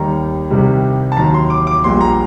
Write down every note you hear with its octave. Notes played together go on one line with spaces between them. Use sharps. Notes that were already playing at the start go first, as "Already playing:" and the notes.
Already playing: D#2 D#3 G3 A#5
C2 C3 D#3 G3
A5
D#2 D#3 F#3 A#5
C6
D6
D6
A#1 A#2 G3 C6
A#5